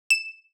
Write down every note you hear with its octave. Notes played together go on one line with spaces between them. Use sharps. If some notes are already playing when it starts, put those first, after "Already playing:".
E7